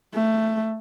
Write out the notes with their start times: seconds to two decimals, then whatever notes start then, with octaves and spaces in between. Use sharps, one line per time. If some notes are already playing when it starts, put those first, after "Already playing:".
0.14 A3